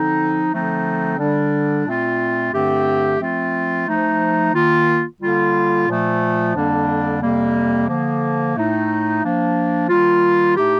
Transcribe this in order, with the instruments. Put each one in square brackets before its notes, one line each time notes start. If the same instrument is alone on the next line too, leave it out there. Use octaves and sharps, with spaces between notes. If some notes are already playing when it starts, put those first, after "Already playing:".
Already playing: [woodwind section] D3 F3 C4 D#4
D3 F3 A3 C4 D#4
D3 G3 D4
A#2 A3 C4 F4
G2 D3 A3 C4 G4
F3 A3 C4 F4
F3 A3 D#4
D#3 A#3 F4
D3 G3 A#3 F4
A#2 F3 A3
F2 D3 G3 A#3 D4
F2 C3 G3 A#3
D3 F3 A#3
A2 A3 D#4
F3 A#3 D4
D#3 G3 A#3 F4
A2 A3 D#4 G4